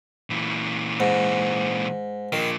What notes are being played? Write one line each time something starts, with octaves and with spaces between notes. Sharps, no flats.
A#2 E3
G#2
A#2 D#3 F3